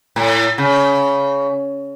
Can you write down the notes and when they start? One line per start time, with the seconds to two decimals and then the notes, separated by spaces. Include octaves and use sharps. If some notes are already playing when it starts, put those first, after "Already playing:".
0.16 A2
0.58 C#3